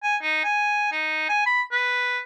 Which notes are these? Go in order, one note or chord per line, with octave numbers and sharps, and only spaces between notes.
G#5
D#4
G#5
D#4
G#5
B5
B4